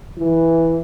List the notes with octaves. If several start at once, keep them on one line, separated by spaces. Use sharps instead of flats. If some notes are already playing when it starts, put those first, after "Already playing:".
E3